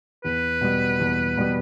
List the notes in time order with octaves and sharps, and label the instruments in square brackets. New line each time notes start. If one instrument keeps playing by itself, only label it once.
[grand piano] E2 [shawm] B4
[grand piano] B2 G3 B3
E2
B2 G3 B3